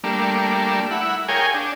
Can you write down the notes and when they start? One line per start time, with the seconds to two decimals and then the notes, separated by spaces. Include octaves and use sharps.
0.04 G3 A3 A#3 D4
0.91 E4 F#5
1.28 G#4 A#4 C#5 F5 G5 G#5
1.54 D4